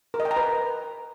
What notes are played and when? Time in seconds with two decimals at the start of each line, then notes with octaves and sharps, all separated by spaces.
0.14 A#4
0.20 D#5
0.25 G5
0.31 A#5
0.37 B4